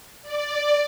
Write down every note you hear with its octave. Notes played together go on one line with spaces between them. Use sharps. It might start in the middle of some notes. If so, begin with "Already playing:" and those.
D5